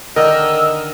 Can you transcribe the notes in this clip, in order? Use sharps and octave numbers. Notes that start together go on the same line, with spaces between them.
D3 D#3 A#4 D#5 E6